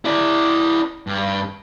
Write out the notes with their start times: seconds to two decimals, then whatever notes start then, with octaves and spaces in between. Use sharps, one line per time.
0.05 E4 D5
1.07 G2